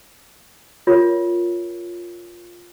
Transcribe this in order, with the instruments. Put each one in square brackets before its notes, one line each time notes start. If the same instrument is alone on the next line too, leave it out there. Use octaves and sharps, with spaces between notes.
[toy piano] F4 A#4 C#5